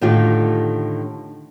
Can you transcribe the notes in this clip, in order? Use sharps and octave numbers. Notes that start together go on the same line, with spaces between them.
A2 D3 D#3 F4 G4